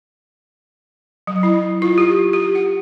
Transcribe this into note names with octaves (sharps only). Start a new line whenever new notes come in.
F#3
E4
F4
G4
G4
F#5